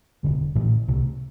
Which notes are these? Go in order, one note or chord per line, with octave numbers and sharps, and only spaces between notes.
E1 D2 D3 G3
A1 A2 E3 A3
C2 C3 E3 A3